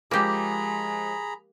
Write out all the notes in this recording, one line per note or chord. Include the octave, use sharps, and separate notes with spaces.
F3 G#3 A#3 G4 G#4 A#5 B5